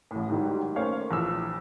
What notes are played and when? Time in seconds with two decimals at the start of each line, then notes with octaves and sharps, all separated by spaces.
0.11 A1 A2
0.29 G#2 D#3 F#3 G3
0.76 A3 A#3 C#4 C5 C#5 F5
1.11 A#1 E3 E6